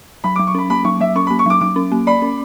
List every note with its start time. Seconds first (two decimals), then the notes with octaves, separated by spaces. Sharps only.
0.24 F#3 B5
0.36 D6
0.39 F#3
0.47 C#6
0.55 C#4 B5
0.70 A#3 B5
0.85 F#3 C#6
1.00 F#3 E5
1.16 C#4 C#6
1.27 B5
1.30 A#3
1.39 C#6
1.46 F#3 D6
1.61 F#3 D6
1.76 C#4
1.92 A#3
2.07 D5 B5
2.22 C#4